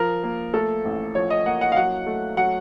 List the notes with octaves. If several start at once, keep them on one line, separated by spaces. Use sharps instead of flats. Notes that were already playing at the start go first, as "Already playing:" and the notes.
Already playing: F3 A#4
A#3
A3 A4
A1
F3 C#5
D#5
A#3 F#5
F#5
F5
F#3 F#5
A3
F#3 F#5